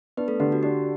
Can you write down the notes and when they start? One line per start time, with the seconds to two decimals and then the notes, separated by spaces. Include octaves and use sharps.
0.17 B3 D4 B4
0.28 A3 A4
0.40 D3 G4
0.52 F#4
0.63 D4 G4